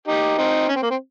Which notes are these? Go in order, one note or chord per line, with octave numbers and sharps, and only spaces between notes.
D#4 G4
C4 D#4
C#4
C4
A#3
C4